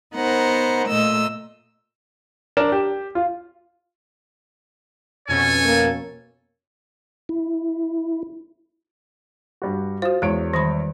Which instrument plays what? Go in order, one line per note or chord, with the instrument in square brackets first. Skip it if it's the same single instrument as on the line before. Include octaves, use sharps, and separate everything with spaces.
[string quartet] B3 D#4 A#4 C5 F#5
A#2 A3 D#5 E6
[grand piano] D4 A#4 E7
G4
F4
[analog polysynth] F2 B2 C#4 [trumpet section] A4 C#5 G#5
[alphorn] A#3
[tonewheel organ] E4
[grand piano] G2 G3 F#4
[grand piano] F4 [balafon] F#4 C5
[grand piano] E2 C#5 D7 [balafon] G#3
[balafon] D#3 G3 B5